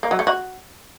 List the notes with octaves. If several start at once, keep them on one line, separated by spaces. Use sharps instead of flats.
A#3
F#3
A3
F#4